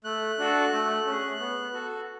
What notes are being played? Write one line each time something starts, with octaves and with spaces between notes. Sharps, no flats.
A3 F#6
D4 F#4 A4
A3
C#4 G#4
B3
F#4 A4